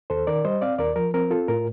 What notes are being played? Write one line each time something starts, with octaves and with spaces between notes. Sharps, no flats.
D#2 A4 C5
D#3 A#4 D5
G3 C5 D#5
C4 D5 F5
D#2 A#4 D5
F3 A#4
C4 A#4
F4 A4
A2 A#4